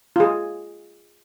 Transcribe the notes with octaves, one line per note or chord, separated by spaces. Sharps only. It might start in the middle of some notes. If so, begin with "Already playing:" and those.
F4 G#4